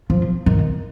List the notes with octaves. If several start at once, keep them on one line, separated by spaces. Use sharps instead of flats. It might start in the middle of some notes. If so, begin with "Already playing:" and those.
F3
D#3